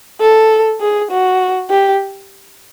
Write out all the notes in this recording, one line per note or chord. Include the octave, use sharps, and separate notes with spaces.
A4
G#4
F#4
G4